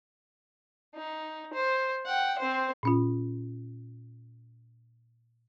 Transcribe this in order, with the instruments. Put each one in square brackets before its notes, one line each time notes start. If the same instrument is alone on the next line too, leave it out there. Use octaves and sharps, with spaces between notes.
[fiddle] D#4
C5
F#5 G5
C4 C5
[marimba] A#2 C#4 F4